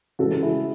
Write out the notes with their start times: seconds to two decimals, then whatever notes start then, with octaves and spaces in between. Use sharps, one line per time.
0.19 C#3 E3 G#3 F#4 A4
0.43 E4 G#4